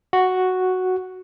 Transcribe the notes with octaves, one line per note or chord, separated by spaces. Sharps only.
F#4